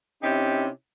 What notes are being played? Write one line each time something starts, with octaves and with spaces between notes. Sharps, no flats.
C3 C#4 D#4 E4 G4